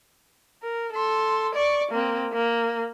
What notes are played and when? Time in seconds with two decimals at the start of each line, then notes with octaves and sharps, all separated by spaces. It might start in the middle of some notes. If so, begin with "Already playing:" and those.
0.63 A#4
0.92 A4 C6
1.55 D5 C#6
1.91 A#3 C4
2.33 A#3